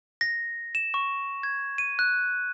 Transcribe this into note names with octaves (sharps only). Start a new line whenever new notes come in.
A#6
E7
C#6
G#6
D#7
F#6